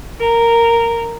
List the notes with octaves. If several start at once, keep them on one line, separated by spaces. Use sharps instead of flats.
A#4